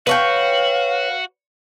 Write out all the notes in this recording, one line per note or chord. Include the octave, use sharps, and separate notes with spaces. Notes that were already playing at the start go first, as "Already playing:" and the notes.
F#4 B4 C#5 F5 G5